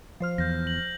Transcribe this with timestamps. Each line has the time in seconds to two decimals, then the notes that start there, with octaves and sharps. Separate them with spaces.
0.20 F3 C5 F6
0.38 E2 G6 A#6
0.67 F#7